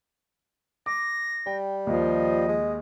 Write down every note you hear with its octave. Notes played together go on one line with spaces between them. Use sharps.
D6 A#6
G3 G5
D#2 F3 D#5
G#3